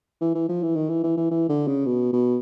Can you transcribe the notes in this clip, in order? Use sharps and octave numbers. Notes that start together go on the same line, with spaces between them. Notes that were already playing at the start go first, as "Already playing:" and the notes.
E3
E3
F3
E3
D#3
E3
E3
E3
E3
D3
C#3
B2
B2